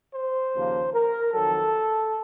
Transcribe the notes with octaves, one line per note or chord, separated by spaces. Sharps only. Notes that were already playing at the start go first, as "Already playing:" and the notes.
C5
D#2 C#3 F3 A#3
A#4
F2 D#3 F#3 A4